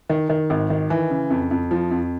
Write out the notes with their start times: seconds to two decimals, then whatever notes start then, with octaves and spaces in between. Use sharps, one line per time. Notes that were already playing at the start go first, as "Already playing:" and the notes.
0.09 D#3
0.29 D#3
0.50 G#1
0.70 D#3
0.90 E3
1.10 C#3
1.30 F2
1.51 F2
1.71 F3
1.91 F2